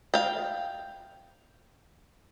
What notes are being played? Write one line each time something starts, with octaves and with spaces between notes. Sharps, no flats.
F5 G5